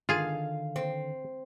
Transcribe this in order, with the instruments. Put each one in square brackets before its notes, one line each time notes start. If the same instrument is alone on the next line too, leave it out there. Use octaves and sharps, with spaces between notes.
[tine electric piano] D3 D#3 [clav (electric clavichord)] F4 G#4 [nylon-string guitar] F5
[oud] C4